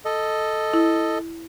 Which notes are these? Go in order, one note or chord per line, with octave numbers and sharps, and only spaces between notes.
A4 D#5
E4